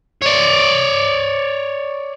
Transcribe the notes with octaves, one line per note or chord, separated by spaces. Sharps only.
C#5 D5